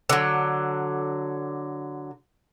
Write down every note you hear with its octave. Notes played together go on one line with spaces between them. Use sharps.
D3 F#3